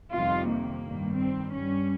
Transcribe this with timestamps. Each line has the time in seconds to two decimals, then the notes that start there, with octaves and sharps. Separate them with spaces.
0.13 F2 C3 D#3 G3 F4
0.48 A#3
0.83 G2 D#3 G3
1.18 C4
1.53 G2 G3 C#4